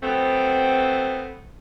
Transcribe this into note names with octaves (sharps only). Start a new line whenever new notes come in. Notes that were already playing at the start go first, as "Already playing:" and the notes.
F#3 A3 B3 C4